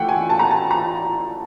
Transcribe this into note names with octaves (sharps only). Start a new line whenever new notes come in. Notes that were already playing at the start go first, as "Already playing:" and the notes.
Already playing: E3 A3 F#5 G5
G#5
A5
A#5
A5
A#5